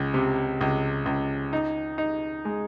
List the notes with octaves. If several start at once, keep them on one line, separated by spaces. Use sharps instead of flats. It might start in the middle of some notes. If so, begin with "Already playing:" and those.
Already playing: C#2
C3
C#2
C#2
D#4
D#4
G#3